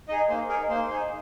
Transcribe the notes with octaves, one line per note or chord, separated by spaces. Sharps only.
D#4 G#4 D#5
A#3 C5
D#4 G#4 A#4
A#3 C5
D#4 G#4